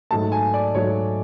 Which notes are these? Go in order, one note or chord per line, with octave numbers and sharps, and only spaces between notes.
G#2 F#3 A3 A5
G#5
D5
G#2 F#3 A3 C#5